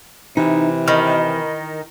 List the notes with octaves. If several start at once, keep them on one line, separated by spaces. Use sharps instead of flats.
C3 E3 D#4
D#3 B5 F6